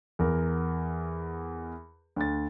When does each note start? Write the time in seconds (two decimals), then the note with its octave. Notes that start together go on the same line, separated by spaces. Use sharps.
0.19 E2 A#4
2.16 D2 A6